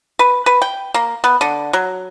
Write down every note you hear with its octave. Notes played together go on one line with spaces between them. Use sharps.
B4
B4
G5
A#3
B3
D3
F#3